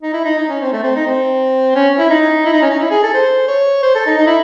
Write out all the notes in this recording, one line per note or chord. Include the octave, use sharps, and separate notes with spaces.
D#4
E4
D#4
D#4
C#4
C4
A3
C4
D#4
C4
C#4
E4
D#4
E4
D#4
C#4
D#4
E4
G#4
A4
C5
C#5
C5
A4
D#4
D#4
E4